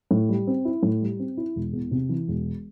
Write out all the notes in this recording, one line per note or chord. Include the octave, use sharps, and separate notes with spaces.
A2
G3
C4
E4
A2
G3
C4
E4
E1
E2
C3
E3
E1